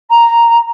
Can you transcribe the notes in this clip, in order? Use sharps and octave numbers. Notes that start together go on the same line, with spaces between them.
A#5